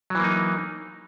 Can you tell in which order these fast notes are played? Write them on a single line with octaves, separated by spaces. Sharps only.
F#3 E3 A#3 D#4